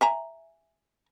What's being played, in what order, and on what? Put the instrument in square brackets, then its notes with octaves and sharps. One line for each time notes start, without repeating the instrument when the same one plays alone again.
[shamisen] E5 G#5 A#5